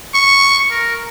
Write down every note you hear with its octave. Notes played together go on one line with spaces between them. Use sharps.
C#6
A#4